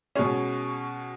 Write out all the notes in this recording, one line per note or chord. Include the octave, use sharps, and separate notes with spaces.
B2 G#3 C#4